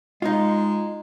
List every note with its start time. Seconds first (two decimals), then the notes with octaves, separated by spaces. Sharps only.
0.22 G#3 D#4 F4